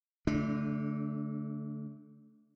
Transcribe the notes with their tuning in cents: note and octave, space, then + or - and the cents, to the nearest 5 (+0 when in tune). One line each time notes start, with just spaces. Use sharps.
D3 -35 A3 -10 D4 +0